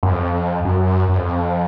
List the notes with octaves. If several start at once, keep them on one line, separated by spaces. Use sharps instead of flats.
F#2
F2
F#2
F#2
F2